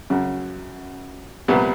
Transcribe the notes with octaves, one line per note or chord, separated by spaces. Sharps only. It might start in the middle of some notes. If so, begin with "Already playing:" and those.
F#2 C#3 F#3
C2 A#2 G3 B3